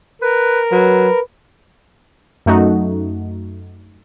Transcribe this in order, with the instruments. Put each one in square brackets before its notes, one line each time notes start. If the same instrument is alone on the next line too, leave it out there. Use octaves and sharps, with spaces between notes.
[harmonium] A#4 [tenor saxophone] B4
[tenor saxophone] F#3 [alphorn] B4
[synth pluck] F#2 A3 D#4 F#4